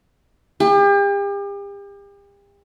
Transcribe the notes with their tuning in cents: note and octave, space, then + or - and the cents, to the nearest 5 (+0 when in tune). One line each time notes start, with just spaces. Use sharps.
G4 +40